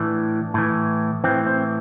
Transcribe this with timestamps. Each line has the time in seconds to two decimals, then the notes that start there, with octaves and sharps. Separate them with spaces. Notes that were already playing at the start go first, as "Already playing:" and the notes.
Already playing: A2 E3 D4
0.54 A2 E3
1.24 A2 E3 C4
1.47 C4